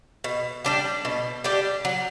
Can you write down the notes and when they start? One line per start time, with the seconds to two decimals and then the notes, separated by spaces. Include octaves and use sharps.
0.24 B2
0.65 G3 D4 G4
1.05 B2
1.44 G3 D4 G4
1.85 F#3